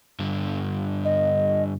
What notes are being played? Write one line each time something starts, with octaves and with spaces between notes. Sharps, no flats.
G2 D3
D#5